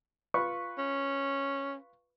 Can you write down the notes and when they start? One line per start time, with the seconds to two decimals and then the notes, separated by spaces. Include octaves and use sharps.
0.34 F4 B4 C#6
0.78 C#4